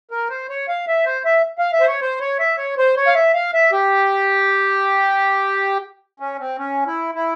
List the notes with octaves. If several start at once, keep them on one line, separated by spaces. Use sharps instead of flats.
A#4
C5
C#5
F5
E5
C5
E5
F5
E5
C5
C#5
C5
C#5
E5
C#5
C5
C#5
F5
E5
F5
E5
G4
C#4
C4
C#4
E4
E4